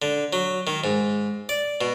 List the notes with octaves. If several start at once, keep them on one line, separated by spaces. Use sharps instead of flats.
D3
F#3
D#3
G#2
D5
B2